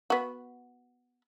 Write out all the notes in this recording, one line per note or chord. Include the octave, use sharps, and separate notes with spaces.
B3 F#4